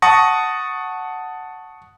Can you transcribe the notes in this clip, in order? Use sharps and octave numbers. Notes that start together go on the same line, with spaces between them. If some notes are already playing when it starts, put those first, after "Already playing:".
F#5 A5 C#6 D#6 A#6